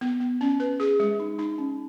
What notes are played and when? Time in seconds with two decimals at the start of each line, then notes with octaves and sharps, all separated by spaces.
0.01 B3
0.21 B3
0.41 C#4
0.60 B4
0.80 G#4
1.00 G#3
1.20 D#4
1.39 D#4
1.58 C#4